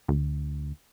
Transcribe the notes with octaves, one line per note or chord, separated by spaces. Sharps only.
D2